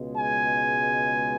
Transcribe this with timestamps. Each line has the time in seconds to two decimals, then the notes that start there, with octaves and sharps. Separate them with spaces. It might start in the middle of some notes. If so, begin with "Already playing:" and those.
Already playing: C#2 B2 G#3
0.16 G#5